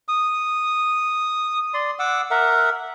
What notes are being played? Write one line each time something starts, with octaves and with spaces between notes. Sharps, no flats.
D#6
D5 C6
F#5 D6 E6
A#4 E5 F#5